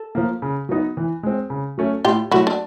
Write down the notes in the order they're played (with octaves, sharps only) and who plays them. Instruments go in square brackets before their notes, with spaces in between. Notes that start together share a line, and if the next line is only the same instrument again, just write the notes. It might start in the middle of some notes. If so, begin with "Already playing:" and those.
Already playing: [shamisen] A4
[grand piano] F3 A#3
C#3
F#3 B3 D#4
E3
G#3 C4
C#3
F#3 A3 C#4
[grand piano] A2 [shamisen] F4 G4
[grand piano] F#3 A3 [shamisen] E4 F#4
[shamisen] D4